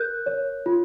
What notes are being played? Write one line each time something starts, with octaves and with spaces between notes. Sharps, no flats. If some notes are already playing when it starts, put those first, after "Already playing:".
Already playing: A#4 F#6 G6
C#5
F4